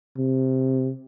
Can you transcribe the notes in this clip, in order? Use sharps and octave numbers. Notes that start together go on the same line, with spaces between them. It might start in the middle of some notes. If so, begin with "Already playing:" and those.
C3